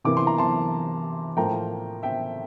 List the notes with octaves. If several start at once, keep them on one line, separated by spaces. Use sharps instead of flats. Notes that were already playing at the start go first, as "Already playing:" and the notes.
C3 E3 A#3 D6
C6
A#5
A5 C6
A2 F3 A#3 G5 A#5
E5 G5